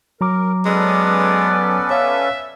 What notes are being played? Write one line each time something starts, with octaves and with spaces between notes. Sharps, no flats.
F#3 A#4 A#5 D6
G#3 B3 C#4 A4 B4 D5
C#5 E5 F5